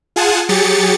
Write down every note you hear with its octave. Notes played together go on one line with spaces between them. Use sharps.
F4 G#4 F#5 G#5 A5
F#3 G4 G#4 A6 C#7